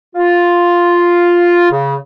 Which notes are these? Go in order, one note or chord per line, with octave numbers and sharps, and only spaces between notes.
F4
C#3